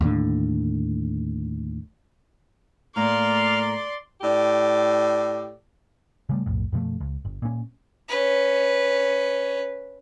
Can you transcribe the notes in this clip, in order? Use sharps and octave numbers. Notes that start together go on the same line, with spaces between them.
D#2 A2 D3
A2 A3 A#3 D5 F5 A#5 C6
A2 G4 D5
C#3 G3 A3
B1 F2 A2
F#2 B2 F3 A3
C#2
G1
A#2 C#4
C#4 B4